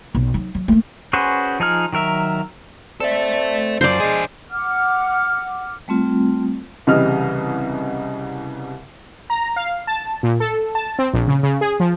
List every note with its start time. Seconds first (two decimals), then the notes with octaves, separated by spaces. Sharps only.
0.15 B1
0.34 F#3 D#4
0.55 F#3
0.68 A3 A#3
1.13 C#4 F#4 G#4 B4 C5
1.60 F3 D#4 G#4 F6
1.93 D#3 F#3 A#4 E5
3.00 C4 A4 D5 E5
3.81 F#2 F3 C5 D5
4.00 G#3 D4 G#4
4.50 F#5 D6 F6
5.88 G3 A3 C4 F4
6.87 C2 C#3 E3 G3 D#5 F6
9.30 A#5
9.56 F5
9.87 A5
10.23 A#2
10.40 A4
10.75 A5
10.99 C4
11.13 A#1
11.28 C#3
11.43 C#3
11.61 G#4
11.80 F3